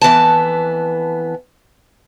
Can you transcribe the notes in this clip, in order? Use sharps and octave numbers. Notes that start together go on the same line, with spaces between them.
F2 E3 B3 A5